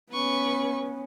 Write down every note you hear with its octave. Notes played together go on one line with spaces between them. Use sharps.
B3 C#4 B4 C#6